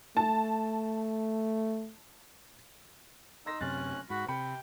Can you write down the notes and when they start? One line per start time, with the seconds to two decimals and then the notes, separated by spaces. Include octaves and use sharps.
0.17 A3 A5
3.46 D#4 D#5 C6 E6 A#6
3.61 F#2 C3 C#4 C6 F6 F#6 A6
4.10 G#2 F#4 B5
4.28 C3 G5 B5 C#7